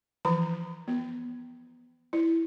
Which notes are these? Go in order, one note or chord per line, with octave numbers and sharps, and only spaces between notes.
E3 F3 A#5
B3
E4